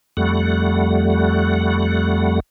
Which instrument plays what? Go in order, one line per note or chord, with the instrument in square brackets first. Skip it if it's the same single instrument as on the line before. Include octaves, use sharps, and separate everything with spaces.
[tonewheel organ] F2 G3 A3 F#5